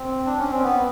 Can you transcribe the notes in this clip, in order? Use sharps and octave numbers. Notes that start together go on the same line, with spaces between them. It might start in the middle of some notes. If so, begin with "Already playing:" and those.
Already playing: C4
D4
C#4
C4
B3